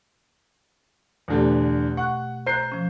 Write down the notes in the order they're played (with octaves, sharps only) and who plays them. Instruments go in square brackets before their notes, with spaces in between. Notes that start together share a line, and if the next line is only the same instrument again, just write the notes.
[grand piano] E2 D3 [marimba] B2 A3 G4
[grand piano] F#5 [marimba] C#6 F#6
[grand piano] C5 G6 C7 [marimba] A#5 F#6
[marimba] F3 C#4